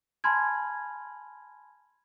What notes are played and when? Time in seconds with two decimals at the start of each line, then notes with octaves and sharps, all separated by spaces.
0.24 G#5 A5 B5 C6 F6 G#6